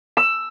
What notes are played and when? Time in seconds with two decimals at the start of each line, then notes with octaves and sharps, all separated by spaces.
0.17 E6